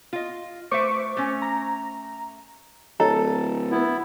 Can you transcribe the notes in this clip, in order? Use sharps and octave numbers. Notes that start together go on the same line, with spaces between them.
F4 D#5
A3 B4 C5 E5 C#6 D6
A3 C#4
A#5
D1 A4 C#5 D#5 A#5
B3 E4